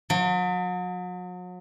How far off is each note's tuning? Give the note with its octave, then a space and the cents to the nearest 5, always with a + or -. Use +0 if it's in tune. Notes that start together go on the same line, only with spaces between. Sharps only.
F#3 -40